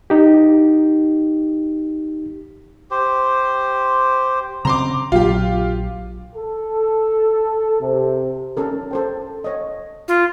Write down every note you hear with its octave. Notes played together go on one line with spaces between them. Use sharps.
D#4 G4
G4 C5
C#3 C4 A#5 C6 D6
A#1 F#3 F4 G4
A4
C3
C#4 A4 A#4
A4 C5 G5
C#5 D#5
F4